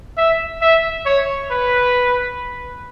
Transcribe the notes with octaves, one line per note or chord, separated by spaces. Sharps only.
E5
E5
C#5
B4